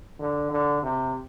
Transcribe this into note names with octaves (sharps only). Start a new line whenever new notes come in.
D3
D3
C3